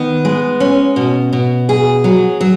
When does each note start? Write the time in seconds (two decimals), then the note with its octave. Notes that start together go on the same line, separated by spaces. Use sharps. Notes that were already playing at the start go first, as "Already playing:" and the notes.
Already playing: D#3 B3
0.25 G#3
0.60 C#4
0.96 B2
1.33 B2
1.69 G#4
2.04 F#3
2.41 F#3